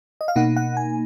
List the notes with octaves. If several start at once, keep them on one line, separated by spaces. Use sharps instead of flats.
D#5
F5
B2 A#3 D#4 F#5
F#5
G#5